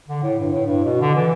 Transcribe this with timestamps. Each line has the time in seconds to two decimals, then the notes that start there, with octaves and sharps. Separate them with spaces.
0.09 D3
0.23 A2
0.39 G2
0.52 A2
0.66 G2
0.84 B2
1.01 D3
1.15 E3